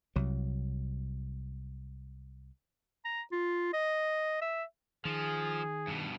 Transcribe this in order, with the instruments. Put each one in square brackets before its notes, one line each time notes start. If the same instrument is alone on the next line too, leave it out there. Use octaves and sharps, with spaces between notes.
[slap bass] C2 F#3
[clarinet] A#5
F4
D#5
E5
[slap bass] D#3 [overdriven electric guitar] F3 [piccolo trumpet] G#4
[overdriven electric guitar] G2 B2